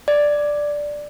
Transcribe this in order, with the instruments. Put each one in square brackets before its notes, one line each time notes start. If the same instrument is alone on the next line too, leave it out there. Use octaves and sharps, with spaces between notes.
[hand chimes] D5